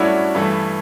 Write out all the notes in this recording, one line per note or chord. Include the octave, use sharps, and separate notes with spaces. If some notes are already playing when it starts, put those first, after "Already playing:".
Already playing: G2 F#3 A3 C#4 D4 E4 F#4
G2 E3 A3